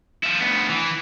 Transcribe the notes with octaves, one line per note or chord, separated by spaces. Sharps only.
F3 E4
D2 B3
E3